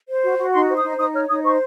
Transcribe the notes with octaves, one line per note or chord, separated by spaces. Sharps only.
C5
F#4
F#4
D#4 C6
C5
D#6
D#4
D#4 D#6
C#5 F6
D#4 D#6
C5 C#6